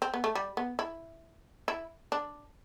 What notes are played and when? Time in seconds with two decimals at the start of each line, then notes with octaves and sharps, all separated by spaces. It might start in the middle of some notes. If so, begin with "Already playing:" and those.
0.02 C4
0.14 B3
0.24 A3
0.35 G3
0.57 B3
0.79 E4
1.68 E4
2.12 D4